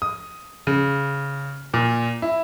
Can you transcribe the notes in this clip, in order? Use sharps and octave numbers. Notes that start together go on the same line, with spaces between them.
D#6
C#3
A#2
E4